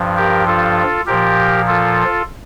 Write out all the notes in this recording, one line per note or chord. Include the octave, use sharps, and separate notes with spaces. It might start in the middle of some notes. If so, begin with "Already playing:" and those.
Already playing: G2 F3
G4 A#4
F4 A4
A#2 F3 G4 A#4
F4 A4